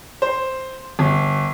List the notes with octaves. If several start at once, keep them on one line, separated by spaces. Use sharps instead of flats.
C5
G1